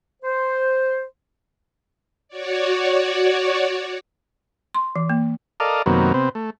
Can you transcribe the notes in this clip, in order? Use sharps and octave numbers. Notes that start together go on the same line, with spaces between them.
C5
F#4 C#5 D5
C6
E3
A#3
A4 A#4 D5 D#5 F5
F#2 C3 D#3 F#3 A#3 B3
C3 B3 C4
A3